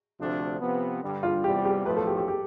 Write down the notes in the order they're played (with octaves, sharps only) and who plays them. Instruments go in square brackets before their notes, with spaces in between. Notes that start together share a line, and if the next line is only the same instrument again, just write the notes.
[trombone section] D2 C3 F3 A3 D4
C3 F3 B3
G2 D3 G3
[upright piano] F4
[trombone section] E2 C3 G3 [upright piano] G4
[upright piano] G4
[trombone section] B1 A2 F3 A3 [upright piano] B4
[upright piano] A4
G4
G4
G4